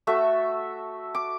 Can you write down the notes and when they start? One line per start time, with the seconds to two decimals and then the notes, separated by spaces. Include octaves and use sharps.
0.07 A3 F#4 A4 E5
1.15 D6